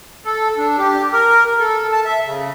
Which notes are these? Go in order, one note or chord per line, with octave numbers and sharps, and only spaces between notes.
A4
D4
G4
A#4
A4
A5
E5
C#3